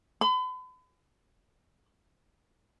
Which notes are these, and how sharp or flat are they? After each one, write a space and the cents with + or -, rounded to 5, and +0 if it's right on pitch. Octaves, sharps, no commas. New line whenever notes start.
B5 +40